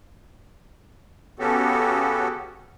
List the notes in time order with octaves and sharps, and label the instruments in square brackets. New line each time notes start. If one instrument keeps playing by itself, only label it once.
[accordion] C#3 B3 C#4 F#4 G4 A4